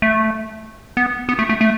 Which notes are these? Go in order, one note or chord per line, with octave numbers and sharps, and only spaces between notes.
A3
B3
B3
A3
A3
A3